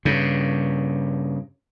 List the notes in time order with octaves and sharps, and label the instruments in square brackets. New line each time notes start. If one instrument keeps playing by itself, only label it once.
[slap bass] G2 C#3